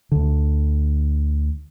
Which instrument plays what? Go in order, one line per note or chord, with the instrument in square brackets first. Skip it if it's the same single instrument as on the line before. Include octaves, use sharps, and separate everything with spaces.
[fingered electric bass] D2 D3